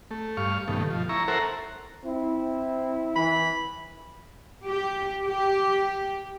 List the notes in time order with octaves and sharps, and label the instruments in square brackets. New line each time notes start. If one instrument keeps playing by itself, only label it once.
[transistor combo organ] A3
G2 F5 C#6
G2 B2 D#3 A3
F3
E4 A#5 C#6
A4 A#4 C5 E5 F#5 A#5
[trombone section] C4 E4
[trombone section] E3 [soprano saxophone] B5
[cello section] G4
G4